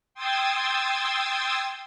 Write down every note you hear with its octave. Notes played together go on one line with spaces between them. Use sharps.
G5 C6 D#6 E6 G#6 A6